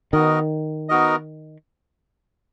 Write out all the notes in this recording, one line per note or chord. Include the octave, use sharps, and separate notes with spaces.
D#3 B3 D#4 F#4 A#4 D#5
B3 D#4 F#4 A#4 D#5